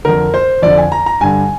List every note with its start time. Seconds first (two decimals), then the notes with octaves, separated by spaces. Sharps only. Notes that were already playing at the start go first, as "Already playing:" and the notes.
0.05 F2 D3 A#4
0.34 C5
0.62 F2 D3 D5
0.78 G#5
0.92 A#5
1.06 A#5
1.21 G2 D3 G#5